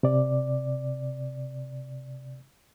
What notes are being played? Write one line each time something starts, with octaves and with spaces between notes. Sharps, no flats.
C3 D5